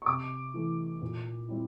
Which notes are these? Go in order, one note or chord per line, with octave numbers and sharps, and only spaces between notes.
C#6
C3 D6
E3 A3
A#2
G3 C4 E4